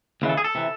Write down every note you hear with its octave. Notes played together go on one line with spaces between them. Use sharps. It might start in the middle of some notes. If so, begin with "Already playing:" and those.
D#2 C#3 E3
A4
G#4
A4
C3 E3